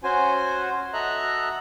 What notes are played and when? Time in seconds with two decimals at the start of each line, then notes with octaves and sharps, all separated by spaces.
0.04 C#4 F#4 C5 G#5
0.93 F#4 A4 D#5 E5 A#5 F#6